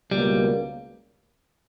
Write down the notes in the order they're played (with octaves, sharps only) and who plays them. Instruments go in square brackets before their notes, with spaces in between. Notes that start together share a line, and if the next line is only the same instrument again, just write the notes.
[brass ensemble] C#2 B2 A#3 [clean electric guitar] G3